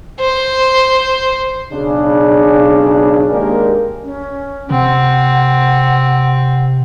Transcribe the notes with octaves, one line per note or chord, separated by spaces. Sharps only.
C5
B1 C#3 D4
D#2 G#3 A#3 D4 G4 A#4
C#4
C3 C4 F#5